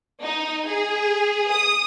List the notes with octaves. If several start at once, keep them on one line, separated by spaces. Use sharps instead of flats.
D#4
G#4
D#6